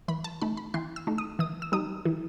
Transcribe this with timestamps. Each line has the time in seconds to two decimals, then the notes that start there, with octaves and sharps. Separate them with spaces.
0.08 E3 B5
0.24 A5
0.41 A3 D#4 B5
0.57 B5
0.74 E3 C6
0.96 E6
1.07 A3 D#4
1.18 D#6
1.39 E3 D#6
1.62 E6
1.72 G3 D#4 D#6
2.05 E3